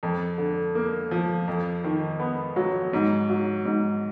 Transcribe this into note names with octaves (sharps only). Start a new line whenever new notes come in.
F2
D3
A#3
F3
F2
D#3
B3
F#3
G#2
F#3
G#2